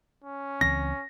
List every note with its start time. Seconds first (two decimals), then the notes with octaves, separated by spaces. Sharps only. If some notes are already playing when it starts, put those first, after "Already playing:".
0.24 C#4
0.61 C#2 E3 C4 A#6